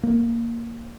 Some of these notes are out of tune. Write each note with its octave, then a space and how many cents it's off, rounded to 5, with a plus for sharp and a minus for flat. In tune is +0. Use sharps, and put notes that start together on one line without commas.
A#3 -5